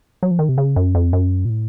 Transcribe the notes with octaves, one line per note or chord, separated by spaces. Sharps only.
F#3
F3
D#3
C3
C#3
F#2
F2
F#2
A#2
A2